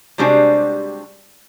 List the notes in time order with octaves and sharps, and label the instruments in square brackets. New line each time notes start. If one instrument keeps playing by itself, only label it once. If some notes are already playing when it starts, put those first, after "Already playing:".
[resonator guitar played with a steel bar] C3 G3 G#3 D4 F#4 C5